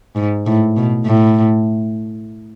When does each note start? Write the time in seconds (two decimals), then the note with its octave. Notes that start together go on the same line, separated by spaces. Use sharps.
0.16 G#2
0.46 A2
0.77 B2
1.06 A2